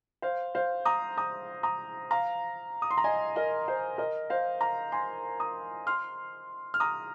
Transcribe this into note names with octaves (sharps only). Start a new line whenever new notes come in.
C5 F5
C5 F5
A#5 D#6
A#5 D#6
A#5 D#6
F5 A#5
D#6
C6
A#5
D#5 G#5
A#4 D#5
C5
A#4 D#5
C5 F5
F5 A#5
G#5 C6
A#5 D#6
C6 F6
F6
A#5 D#6